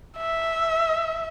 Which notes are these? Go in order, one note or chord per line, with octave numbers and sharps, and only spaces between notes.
E5